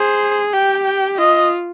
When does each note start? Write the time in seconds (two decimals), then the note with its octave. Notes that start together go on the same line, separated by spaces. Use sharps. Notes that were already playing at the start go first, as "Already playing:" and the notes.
Already playing: G#4 C5
0.53 G4 G5
0.86 G5
1.17 F4 D#5